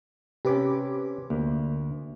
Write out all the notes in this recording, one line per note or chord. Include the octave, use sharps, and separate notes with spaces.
C3 C#4 G4 B4 D6
D2 A#3